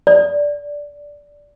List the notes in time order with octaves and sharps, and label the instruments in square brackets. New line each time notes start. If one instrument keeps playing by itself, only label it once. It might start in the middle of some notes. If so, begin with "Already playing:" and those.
[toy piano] D5